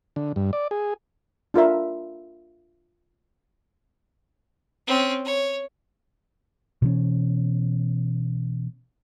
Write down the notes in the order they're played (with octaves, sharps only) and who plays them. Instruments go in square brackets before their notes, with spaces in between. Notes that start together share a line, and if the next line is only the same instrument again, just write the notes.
[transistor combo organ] D3
G2
D5
G#4
[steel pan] D4 F4 A#4 E5
[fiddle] C4 C#4
C#5
[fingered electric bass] B2 E3 C#4